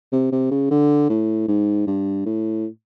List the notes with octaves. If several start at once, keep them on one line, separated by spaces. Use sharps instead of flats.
C3
C3
C#3
D3
A2
G#2
G2
A2